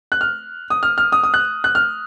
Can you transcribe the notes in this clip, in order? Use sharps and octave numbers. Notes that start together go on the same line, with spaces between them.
F#6
F6
D#6
F6
F6
D#6
D#6
F#6
F#6
F6